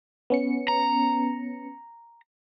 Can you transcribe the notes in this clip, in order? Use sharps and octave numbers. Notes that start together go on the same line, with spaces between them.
B3 C#4 C#7
A#5